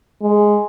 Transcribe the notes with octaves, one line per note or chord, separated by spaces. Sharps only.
G#3